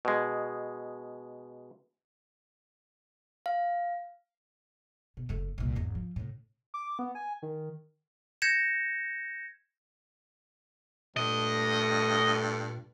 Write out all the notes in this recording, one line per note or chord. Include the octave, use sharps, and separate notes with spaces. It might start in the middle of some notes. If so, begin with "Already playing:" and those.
B2 G#3
F5
B2
F#1 A3
C2 A#2
G#1 E2
F3
A2 C3
D6
B3
G#5
D#3
G6 G#6 A#6 C#7 E7
G2 A#2 A3 D#5